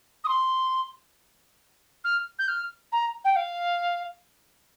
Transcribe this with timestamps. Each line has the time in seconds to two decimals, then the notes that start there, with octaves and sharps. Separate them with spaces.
0.24 D#6
0.28 C6
2.04 F6
2.39 G6
2.48 F6
2.92 A#5
3.24 G5
3.36 F5